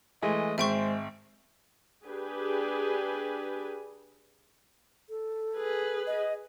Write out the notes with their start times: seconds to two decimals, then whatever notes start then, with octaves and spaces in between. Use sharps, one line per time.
0.22 E3 G#3 A3 D#5
0.58 G#1 G#3 C5 E5 G5 C#6
2.05 D4 G4 G#4 B4
5.10 A4
5.56 G#4 B4
6.07 D#5